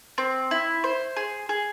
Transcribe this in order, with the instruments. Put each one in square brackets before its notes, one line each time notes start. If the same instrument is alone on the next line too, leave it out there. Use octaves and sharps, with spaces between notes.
[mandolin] C4
E4
C5
G#4
G#4